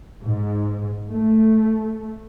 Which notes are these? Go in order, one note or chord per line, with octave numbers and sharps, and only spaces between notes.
G#2
A3